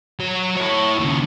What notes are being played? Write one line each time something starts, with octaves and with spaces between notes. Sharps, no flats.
F#3 C#5
E4 C#5
D#2 C#3